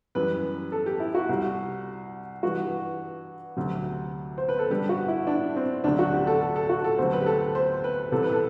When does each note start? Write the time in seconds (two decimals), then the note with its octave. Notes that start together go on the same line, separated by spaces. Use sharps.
0.15 F#2 E3 G3 B4
0.72 A4
0.86 G4
1.00 E4
1.15 F#4
1.29 C2 C3 G3
2.43 G2 E3 G3 F#4
3.57 D2 C3 F#3
4.38 C5
4.49 B4
4.59 A4
4.70 G2 D3 G3 G4
4.89 F#4
5.08 E4
5.27 D4
5.56 C4
5.84 D2 C3 F#3 D4
5.99 F#4
6.13 G4
6.27 A4
6.41 A4
6.56 A4
6.69 F#4
6.84 A4
6.98 D2 C3 F#3 C5
7.13 B4
7.21 G4
7.26 A4
7.55 C5
7.84 B4
8.12 C2 C3 E3 A4
8.23 B4
8.33 A4